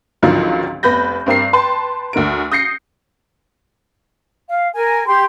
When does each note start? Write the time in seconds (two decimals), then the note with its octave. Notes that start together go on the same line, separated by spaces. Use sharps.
0.23 G#1 C#2 D3 D#3 F3 F#3
0.83 F1 B3 B4 B5 G6 A#6
1.26 G2 C4 A#4 C7
1.53 B4 G5 A5 C6
2.13 D2 D3 A#4 D7
2.52 D#6 G6 A#6 C7 C#7
4.48 F5
4.74 A#4 G#5
5.06 G4 C6